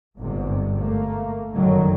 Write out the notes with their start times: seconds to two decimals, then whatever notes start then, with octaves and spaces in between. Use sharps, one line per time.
0.18 G1 G#2 C3
0.79 A3 A#3
1.53 G1 F#2 D3 D#3 F#3